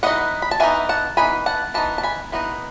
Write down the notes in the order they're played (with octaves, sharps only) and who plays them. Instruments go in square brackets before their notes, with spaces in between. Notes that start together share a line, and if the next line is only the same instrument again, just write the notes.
[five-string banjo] E3 B3 D#4 D#5 F#5
B5
A5
E3 B3 D#4 E5 G#5
F#5 A5
E3 B3 D#4 G#5 B5
F#5 A5
E3 B3 D#4 A5
A5
G#5 B5
E3 B3 D#4